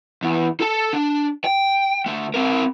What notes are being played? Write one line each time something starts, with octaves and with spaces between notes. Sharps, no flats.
E2
A4 A5
D4
G5
D2 A3
C4 A#4